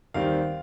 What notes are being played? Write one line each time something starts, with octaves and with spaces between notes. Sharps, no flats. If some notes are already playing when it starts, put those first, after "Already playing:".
D#2 D#3 G3 C4 F5